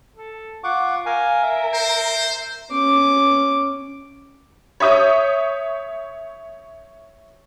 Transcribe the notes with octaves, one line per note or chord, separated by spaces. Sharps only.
A4
F4 F#5 C#6 D6
A#4 F5 G#5
E5
C5
C#4 D6
C#5 E5 D#6 G6